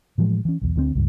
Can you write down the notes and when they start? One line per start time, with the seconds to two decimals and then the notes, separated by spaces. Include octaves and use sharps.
0.18 A2 E3 F3 G#3
0.45 E3 C#4
0.62 B1 E2
0.76 D2 D3 G3 C4
0.95 C#2 G2